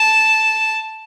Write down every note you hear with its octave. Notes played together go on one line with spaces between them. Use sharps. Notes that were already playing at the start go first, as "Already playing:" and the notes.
Already playing: A5